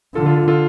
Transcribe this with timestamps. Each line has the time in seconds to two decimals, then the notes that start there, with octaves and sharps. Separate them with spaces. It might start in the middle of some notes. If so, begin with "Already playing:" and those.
0.15 D3 F4 A4
0.25 F4 A4
0.36 F4 A4
0.48 F4 A4